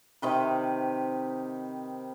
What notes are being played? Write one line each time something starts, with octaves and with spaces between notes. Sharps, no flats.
C3 D#3 B4